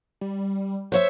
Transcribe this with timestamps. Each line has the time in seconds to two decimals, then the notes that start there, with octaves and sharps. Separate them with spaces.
0.21 G3
0.92 C5 C#5 E5